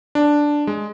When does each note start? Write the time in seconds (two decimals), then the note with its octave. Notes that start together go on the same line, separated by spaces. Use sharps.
0.15 D4
0.67 G#3